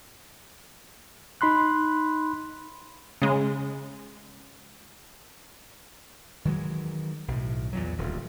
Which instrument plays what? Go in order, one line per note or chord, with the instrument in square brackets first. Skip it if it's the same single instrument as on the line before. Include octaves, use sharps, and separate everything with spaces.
[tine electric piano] D#4 B5 C6 F#6
[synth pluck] C#3 G#3
[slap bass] D#3 E3 F#3 G#3
B1 A2
E2 A#2 F#3
D#1 D2